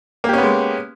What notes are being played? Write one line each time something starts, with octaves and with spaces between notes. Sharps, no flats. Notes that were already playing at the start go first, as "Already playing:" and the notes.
G#3 A#3 B3 C#4 G4